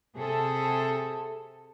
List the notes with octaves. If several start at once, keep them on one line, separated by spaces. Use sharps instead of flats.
C3 G#4 A4